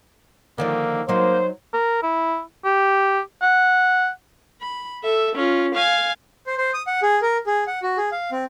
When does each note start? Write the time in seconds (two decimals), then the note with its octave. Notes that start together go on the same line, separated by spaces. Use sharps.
0.58 D3 D#3 F3 A#3
1.09 F#3 A#3 D#4 C5
1.74 A#4
2.03 E4
2.65 G4
3.42 F#5
4.61 B5
5.03 A4 E5
5.35 C#4 F4
5.75 F5 G#5
6.47 C5
6.58 C5
6.74 D#6
6.87 F#5
7.03 G#4
7.22 A#4
7.47 G#4
7.67 F#5
7.82 F#4
7.97 G#4
8.12 F5
8.32 C4